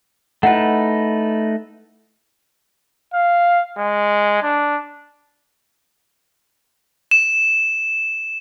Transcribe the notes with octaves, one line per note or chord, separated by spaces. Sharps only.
A3 D#4 E4 B4 F#5
F5
G#3
D4
E7